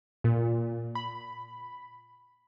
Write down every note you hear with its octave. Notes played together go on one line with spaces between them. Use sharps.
A#2
B5